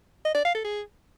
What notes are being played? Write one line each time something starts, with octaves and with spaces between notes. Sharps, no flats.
D#5
D5
F5
A4
G#4